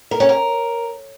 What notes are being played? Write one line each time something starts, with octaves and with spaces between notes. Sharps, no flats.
A#4
C#4
A#4